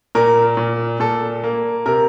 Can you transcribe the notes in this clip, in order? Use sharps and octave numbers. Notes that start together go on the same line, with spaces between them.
A#2 A#4
A#2
A#2 A4
A#3
C3 A#4